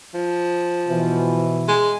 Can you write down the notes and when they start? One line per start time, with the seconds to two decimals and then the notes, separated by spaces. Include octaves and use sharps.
0.14 F3
0.89 B2 E3
1.68 G#3